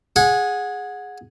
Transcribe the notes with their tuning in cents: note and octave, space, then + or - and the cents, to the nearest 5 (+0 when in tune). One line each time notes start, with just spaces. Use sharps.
G#4 +0 F#5 -20